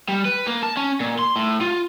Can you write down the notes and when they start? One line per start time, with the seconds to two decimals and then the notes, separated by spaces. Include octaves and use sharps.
0.08 G3
0.25 B4
0.47 A#3
0.63 A5
0.77 C#4
1.00 A#2
1.19 C6
1.36 A2
1.61 F4